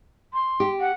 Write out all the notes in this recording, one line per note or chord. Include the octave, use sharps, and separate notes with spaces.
C6
G4
F#5